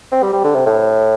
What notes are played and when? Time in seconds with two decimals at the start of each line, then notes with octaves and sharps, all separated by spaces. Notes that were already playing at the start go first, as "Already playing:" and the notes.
0.12 C4
0.23 G3
0.33 G3
0.44 D3
0.55 C3
0.66 A2